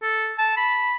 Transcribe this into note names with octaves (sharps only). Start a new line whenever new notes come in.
A4
A5
B5